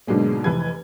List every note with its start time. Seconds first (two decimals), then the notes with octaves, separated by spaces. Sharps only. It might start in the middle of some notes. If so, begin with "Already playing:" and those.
0.07 G#2 B2 D3 F#3 G#3 A#3
0.44 F1 E3 B4 G#6